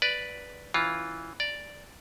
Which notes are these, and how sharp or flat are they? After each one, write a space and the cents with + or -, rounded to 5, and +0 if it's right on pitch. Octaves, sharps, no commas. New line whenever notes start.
B4 +0 D5 +0
E3 -10 C#4 +0 F4 +0
D5 +0 A#5 +20